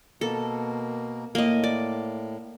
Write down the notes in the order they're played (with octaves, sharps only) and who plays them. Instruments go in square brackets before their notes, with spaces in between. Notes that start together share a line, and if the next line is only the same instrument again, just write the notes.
[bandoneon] B2 A#3 [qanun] A4
[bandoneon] A2 [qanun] A#3 D#5
[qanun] D5